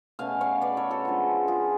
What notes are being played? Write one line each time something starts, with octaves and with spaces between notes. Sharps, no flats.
B2 A3 C#4 F5 G#5
C#5 F5
B4 D5
A4 C#5
F#4 A4
F3 G#3 D4 F4
F4 G#4